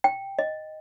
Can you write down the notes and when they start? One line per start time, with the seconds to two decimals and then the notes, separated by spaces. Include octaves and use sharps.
0.04 G5
0.39 D#5